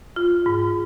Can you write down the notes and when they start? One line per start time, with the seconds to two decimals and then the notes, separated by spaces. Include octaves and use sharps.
0.16 F4
0.46 G#2